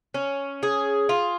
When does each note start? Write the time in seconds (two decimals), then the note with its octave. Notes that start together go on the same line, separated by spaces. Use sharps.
0.14 C#4
0.63 G#4
1.09 F4